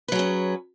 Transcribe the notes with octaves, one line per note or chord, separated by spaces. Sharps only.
F#3 C#4 G#4 B4